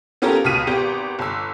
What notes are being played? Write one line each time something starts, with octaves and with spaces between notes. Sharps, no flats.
B3 C#4 F4 G4 A4 A#4
C#2 B2 F6 B6 D#7
G#1 B3 G4
G1 E6